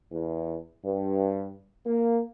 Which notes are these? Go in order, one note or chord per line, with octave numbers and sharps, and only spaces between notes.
E2
G2
A#3